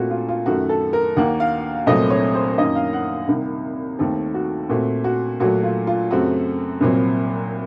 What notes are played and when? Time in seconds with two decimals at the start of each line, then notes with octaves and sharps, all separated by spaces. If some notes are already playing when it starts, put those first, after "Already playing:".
Already playing: A#2 A3 C4 F4 F#4
0.10 F4
0.28 F4
0.46 F#2 D#3 A3 F#4
0.69 A4
0.93 A#4
1.17 D#2 D#3 A#3 F#5
1.40 F5
1.86 C2 A#2 F#3 A3 C4 D#5
2.10 C#5
2.34 C5
2.58 F#2 D#3 A#3 D#5
2.75 F5
2.93 F#5
3.28 C2 C3 D#3
3.99 D#2 D#3 A3 C4 A4
4.34 F#4
4.69 A#2 A3 C4 F#4
5.04 F#4
5.40 A#2 F#3 A3 F#4
5.63 F4
5.87 F4
6.10 F#2 C#3 A3 C4 F#4
6.81 C2 A#2 F#3 C4